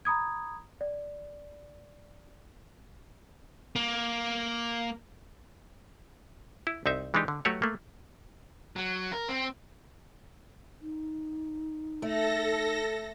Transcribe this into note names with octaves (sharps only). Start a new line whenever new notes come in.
A#5 B5 D#6 G#6
D5
A#3
E4
C2 C4 D#4 E5
E3 G#3 D4 D#4 G4
D3
F#3 A3 F#4 G4 B4 C#5
A3 A#3
F#3
A#4
C4
D#4
A3 A4 A#6